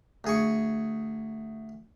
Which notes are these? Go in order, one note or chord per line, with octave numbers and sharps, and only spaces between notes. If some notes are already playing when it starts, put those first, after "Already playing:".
D2 G#4 C#6